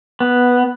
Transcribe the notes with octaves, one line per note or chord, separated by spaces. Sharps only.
B3